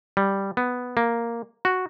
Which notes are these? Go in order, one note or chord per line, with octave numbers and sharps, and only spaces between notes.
G3
B3
A#3
F#4